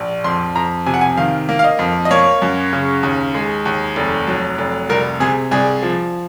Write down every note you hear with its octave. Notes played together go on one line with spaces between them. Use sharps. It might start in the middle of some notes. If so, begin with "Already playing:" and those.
Already playing: A#1
F2 C6
F2 A#5
C3 G#5
F#5
G#5
D#3 F5
A#3
F5
D#5
F2
D#5
A#3 C#5
F#2
C#3
D#2
G#3
D#2
F1
F#3
F1
C2 A#4
C3 G#4
C2 G#4
F3